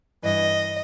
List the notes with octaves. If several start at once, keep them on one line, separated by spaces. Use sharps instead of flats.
G2 E3 D#5